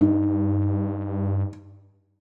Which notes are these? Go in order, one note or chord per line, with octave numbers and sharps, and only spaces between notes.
G2 D#4